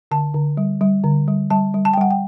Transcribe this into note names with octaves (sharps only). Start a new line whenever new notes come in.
D3 A5
D3
G3
G3
D3
G3
G3 A5
G3
A5
G5
G3 F#5
G5